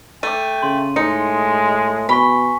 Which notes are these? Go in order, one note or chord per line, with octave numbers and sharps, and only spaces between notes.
A3 G5 D6 D#7
C#3 C6
A2 G#3 D#4 C#7
B2 G#5 B5 C#6 B6